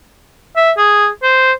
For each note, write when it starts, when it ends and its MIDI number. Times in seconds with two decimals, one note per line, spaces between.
0.56 0.71 76
0.77 1.07 68
1.23 1.52 72